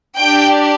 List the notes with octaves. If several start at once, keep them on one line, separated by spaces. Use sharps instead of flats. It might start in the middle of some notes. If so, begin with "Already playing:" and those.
D4 G4 G5